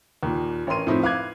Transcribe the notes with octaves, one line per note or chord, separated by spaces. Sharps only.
D#2 A#2
A1 C#4 A#4 C6 D#7
A2 F3 C4 D#4 E4
B4 F5 D6 F#6 G#6